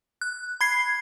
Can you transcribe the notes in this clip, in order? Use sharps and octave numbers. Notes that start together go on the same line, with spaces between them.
F#6
B5 G#6 C7